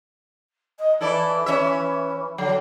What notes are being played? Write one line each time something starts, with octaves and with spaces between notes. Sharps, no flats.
D#5
E3 E4 A4 D5
E3 C#4 E5
E3
D3 F#3